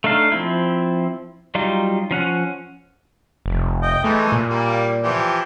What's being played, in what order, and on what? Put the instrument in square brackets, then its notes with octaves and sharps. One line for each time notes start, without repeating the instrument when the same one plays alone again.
[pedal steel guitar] A3 D4 D#4 F5
F3 C4 E4
F#3 G3 D#4 F4
F3 C#4 F#5
[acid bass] F1
[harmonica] D#5 G5
[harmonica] E3 G#3 D#4 [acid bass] A3
[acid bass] A#2
[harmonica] G3 A#3
E3 F3 G4